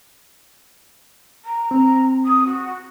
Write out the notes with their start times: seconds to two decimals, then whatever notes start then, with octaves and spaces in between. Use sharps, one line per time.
1.44 A#5
1.71 C4
2.25 D#6
2.45 F#4